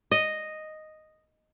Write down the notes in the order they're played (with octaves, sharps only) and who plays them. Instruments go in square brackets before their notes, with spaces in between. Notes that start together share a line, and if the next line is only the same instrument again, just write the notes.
[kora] D#5